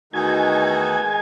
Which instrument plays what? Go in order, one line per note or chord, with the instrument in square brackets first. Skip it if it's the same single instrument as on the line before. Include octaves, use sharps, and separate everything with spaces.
[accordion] E2 D#3 A3 D#4 F#4 [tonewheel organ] G#5
[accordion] D#3 G#3 D#4